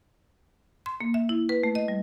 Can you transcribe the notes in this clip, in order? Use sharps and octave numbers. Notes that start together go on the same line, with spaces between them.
C6
A#3
E5
E4
B4
A3
D#5
G3